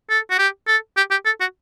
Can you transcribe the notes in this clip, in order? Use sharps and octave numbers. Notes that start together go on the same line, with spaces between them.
A4
F#4
G4
A4
G4
G4
A4
F#4